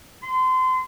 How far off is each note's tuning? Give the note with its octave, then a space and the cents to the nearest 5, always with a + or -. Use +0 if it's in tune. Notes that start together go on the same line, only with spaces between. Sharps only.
C6 -30